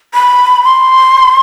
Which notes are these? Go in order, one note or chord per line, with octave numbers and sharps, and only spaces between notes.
B5
C6